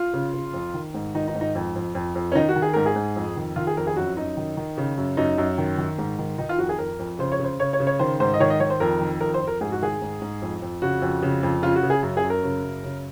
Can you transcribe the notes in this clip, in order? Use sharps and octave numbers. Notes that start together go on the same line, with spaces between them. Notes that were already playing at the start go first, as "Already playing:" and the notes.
Already playing: F4
C#3
C#3
F2
D#3
G#2
D#3 D#4
D#4
G#2
D#4
F2
F2
F2
F2
C#4
D#3 D#4
F#4
D#3
G#4
G#2 A#4
G#4
G#2
F2
D#3
D#3 F4
G#4
F2 A#4
G#4
F#2 F#4
F#2 D#4
D#3
D#3
C#3
F#2
F#2 D#4
F#2
D#3
D#3
G#2
D#3
D#3 D#4
F4
F2 F#4
G#4
F2 A#4
F2
C#3 C5
C#5
C#3 C5
C#3 C#5
C#5
C#3
C#5
D#3 C5
G#2 C5
D#5
D#3 C#5
D#5
D#3 C#5
C5
F2 A#4
D#3
F2 A#4
C5
F2
A#4
G#2 G#4
F#4
D#3 G#4
G#2
G#2
F2
F2
C#3 F#4
F2
C#3
F2
C#3 F4
F#4
C#3
G#4
F#2
G#4
F#2
A#4
C#3
F#2
C#3